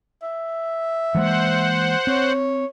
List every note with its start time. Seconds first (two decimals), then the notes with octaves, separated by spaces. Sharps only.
0.22 E5
1.15 E3 G#3 A#3 C5 F#5
2.07 C4 C#5